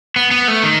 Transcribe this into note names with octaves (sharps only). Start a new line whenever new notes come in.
B3
B3
A3
D#3